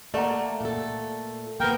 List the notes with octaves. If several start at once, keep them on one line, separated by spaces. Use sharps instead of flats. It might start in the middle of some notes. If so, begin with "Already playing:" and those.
A3 A#3 D5 F#5 A#5
A#2 A4
A#3 B3 A#4 G5